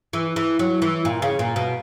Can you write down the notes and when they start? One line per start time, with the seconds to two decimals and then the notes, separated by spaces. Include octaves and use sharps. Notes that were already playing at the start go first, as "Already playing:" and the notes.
0.13 E3
0.36 E3
0.59 F#3
0.82 E3
1.05 A#2
1.22 C#3
1.39 A#2
1.56 B2